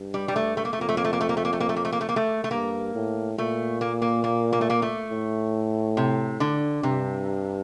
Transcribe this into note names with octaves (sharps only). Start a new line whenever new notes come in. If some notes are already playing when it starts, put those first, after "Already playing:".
Already playing: G2
G3
G3
A3
A3
A#3
A3
F2 A#3
A3
A#3
A3
A#3
A3
A#3
A3
A#3
A3
A#3
A3
A#3
A3
A#3
A3
A#3
A3
A3
G2 A#3
A2
A#2 A3
A#3
A#3
A#3
A#3
A3
A#3
A3
A2
C3
D3
G2 C3